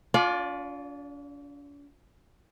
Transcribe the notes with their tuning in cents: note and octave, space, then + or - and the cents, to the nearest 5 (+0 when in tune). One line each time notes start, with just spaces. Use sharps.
D4 -45 F4 +20 D5 +0